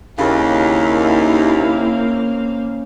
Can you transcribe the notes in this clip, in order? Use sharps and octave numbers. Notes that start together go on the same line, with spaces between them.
D#2 C#3 A#3 C4 E4 F5